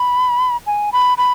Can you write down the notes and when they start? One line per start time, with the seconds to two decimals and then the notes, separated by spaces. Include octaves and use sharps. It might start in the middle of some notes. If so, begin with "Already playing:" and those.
Already playing: B5
0.67 G#5
0.92 B5
1.18 B5